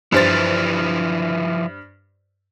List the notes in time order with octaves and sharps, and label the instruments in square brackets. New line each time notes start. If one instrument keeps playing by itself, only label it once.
[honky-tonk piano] G2 C5 A6 [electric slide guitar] F3 E4 B4